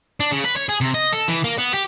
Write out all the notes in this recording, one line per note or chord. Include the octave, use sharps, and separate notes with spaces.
D4
C#3
B4
C#5
G#4
C3
D#5
A4
E3
A#3
B3
G4